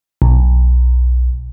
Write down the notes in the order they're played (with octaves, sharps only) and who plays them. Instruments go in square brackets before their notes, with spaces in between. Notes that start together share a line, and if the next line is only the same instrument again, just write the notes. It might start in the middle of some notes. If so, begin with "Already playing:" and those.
[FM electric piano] B1